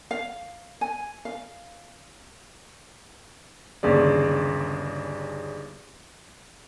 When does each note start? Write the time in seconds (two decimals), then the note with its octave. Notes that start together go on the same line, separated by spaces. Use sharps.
0.11 F5
0.81 G#5
1.25 F5
3.83 G1 D#2 C#3 G#4 D5